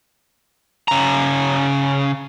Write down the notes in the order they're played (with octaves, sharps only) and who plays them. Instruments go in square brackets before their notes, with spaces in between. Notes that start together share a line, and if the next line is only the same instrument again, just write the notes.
[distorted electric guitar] C#3 A#5